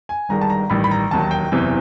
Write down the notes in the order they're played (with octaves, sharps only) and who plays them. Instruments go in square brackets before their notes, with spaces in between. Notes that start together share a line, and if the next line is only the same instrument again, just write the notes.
[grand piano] G#5
G1 G2 D#3 G#3 A#5
A5
A#5
A1 G2 D#3 B5
B5
A#5
E1 D#2 D#3 F#3 A5
G5
F#1 E2 C3 E3